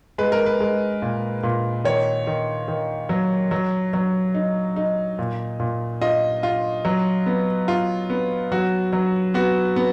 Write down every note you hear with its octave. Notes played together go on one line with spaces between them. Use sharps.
G#3 B4
A#4
B4
G#3
A#2
A#2
D#3 C#5
D#3
D#3
F#3
F#3
F#3
D#4
D#4
A#2
A#2
F4 D#5
F4
F#3
B3
F4
B3
F#3 F#4
F#3
B3 F#4
B3